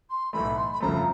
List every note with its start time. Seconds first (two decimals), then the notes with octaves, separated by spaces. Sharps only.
0.09 C6
0.33 B1 A2 E3 A3 B5
0.57 C6
0.72 B5
0.81 G1 F2 C#3 F3 A3 A#5